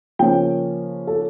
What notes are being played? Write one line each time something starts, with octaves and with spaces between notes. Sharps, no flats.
C#3 F3 A#3 C#4 G5
A4